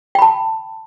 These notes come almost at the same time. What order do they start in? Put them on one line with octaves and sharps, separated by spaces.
G5 B5 A5